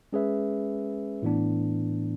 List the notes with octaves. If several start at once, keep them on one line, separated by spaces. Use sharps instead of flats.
G#3 C#4 G#4 B4 E5
A2 E3 B3 D4